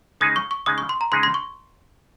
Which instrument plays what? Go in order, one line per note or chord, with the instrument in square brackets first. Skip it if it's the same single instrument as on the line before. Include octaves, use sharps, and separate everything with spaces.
[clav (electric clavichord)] C#3 G#3 D#4 G#4 [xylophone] D#6
[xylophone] C#6
C#6
[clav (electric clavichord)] C#3 G#3 D#4 G#4 [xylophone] D#6
[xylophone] C#6
C6
A#5
[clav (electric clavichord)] C#3 G#3 D#4 G#4 [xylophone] C6
[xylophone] C6
C#6